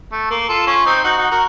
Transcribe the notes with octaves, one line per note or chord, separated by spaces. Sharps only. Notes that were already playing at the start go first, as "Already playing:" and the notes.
A3
A#3
F4 A4
C#4 F4
C4 D#4
D#4 F#4
D#4 F#4
F#4 A#4